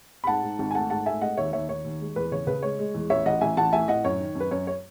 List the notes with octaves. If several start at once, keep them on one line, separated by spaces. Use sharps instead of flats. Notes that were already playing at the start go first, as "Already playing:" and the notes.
B5
G#2 F#5 A5
G#2
G#1
G#5
A3 F#5 A5
G#2 F#5 A5
A3 E5 G#5
G#3 D#5 F#5
D#2 C#5 E5
D#2 C#5 E5
D#2 C#5
D#2
G#3
E2 B4
C#3 C#5
C#3 B4
G#3 C#5
G#3
E2
A1 C#5 E5
A1 D#5 F#5
A1 E5 G#5
A1 F#5 A5
A2 E5 G#5
A2 D#5 F#5
F#2 C#5
D#3
F#2
B4
F#2 C#5
C#5